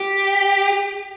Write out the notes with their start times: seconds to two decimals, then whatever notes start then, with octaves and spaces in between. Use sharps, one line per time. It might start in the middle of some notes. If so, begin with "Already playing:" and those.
Already playing: G4